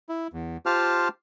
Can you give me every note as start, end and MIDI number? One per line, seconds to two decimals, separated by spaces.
0.09 0.27 64
0.33 0.57 40
0.66 1.08 65
0.66 1.08 67
0.66 1.08 72
0.66 1.08 77
0.66 1.08 81
0.66 1.08 89